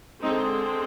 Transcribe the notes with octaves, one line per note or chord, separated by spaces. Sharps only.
D3 G#3 C4 D#4